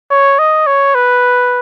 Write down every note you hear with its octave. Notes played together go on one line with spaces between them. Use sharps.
C#5
D#5
C#5
B4